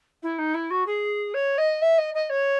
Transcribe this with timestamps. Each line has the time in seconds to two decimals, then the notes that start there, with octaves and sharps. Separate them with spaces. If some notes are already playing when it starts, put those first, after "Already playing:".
0.22 E4
0.38 D#4
0.54 E4
0.70 F#4
0.86 G#4
1.34 C#5
1.57 D#5
1.81 E5
1.98 D#5
2.14 D#5
2.29 C#5